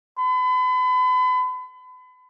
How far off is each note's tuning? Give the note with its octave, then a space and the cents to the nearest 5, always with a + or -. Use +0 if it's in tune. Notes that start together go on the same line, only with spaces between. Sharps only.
B5 +40